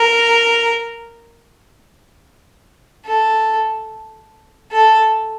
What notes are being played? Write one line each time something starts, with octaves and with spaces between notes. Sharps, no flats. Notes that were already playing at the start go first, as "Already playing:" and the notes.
Already playing: A#4
A4
A4